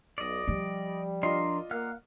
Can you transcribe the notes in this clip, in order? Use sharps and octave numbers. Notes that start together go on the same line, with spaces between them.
B1 D5 D#5
F3 G3
D4 F4 A#4 D5 D#5 C6
A#3 F5 F#5 F6